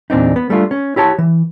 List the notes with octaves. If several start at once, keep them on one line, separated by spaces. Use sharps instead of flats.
E2 A#2 C4 D4 D#4
B3
G3 A3 D4 F4
C#4
E4 G4 C#5 A5
E3